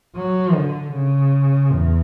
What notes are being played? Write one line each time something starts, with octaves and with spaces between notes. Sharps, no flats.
F#3
D3
C#3
E2